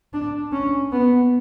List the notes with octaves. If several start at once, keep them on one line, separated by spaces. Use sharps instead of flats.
D4
C#4
B3